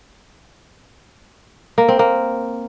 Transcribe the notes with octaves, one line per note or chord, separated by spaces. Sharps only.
A#3
C4
A#3